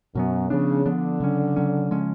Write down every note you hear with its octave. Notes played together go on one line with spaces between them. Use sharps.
F#2 B2 F#3 B3
C#3 F3 B3 D4
D3 F3 B3 D4
C#3 F#3 C#4
C#3 F#3 C#4
C#3 F3 G#3 C#4